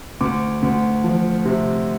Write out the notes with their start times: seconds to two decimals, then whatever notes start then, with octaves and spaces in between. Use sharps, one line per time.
0.21 D2 D6
0.62 D2
1.04 F3
1.45 C3